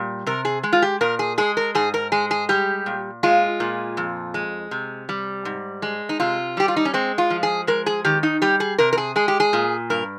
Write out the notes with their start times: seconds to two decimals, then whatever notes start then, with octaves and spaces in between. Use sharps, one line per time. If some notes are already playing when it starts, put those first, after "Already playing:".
Already playing: A#2 G3
0.26 C3 A#4
0.45 G#4
0.63 G#3
0.73 F4
0.82 G4
1.01 A#2 A#4
1.19 G#4
1.38 G#3 G#4
1.57 A#4
1.75 G#2 G#4
1.94 A#4
2.12 G#3 G#4
2.31 G#4
2.49 G3 G4
2.86 A#2
3.23 G#3 F4
3.60 A#2
3.97 F2
4.34 G#3
4.71 C3
5.09 G3
5.45 G#2
5.82 G#3
6.09 D#4
6.20 C3 F4
6.57 G3 G4
6.68 F4
6.76 D#4
6.85 C#4
6.94 G#3 C4
7.18 F4
7.30 F3
7.43 G#4
7.67 G#3 A#4
7.86 G#4
8.05 D#3 G4
8.23 D#4
8.42 G3 G4
8.60 G#4
8.78 C3 A#4
8.93 A#4
8.97 G#4
9.16 G#3 G#4
9.28 G4
9.40 G#4
9.53 A#2
9.90 G2 A#4